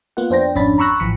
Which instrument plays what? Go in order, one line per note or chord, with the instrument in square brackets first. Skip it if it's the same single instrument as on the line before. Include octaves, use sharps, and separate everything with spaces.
[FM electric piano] A#3 B3 F4 F#5
F2 D4 C5 G5 A#6
G#1 F2 C#4 D4 B5 A6
A#5 B5 C#6 E6 F#6 A#6
A1 E3 F3 B6 C#7